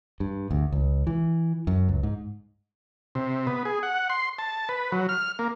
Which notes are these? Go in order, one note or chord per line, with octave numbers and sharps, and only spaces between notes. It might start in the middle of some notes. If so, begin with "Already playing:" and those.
G2
D2
C#2
E3
F#2
C#2
G#2
C3
B3
G#4
F#5
C6
A5
B4
F#3
F6
A#3